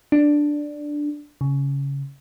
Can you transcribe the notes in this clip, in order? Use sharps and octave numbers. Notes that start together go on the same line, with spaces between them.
D4
C#3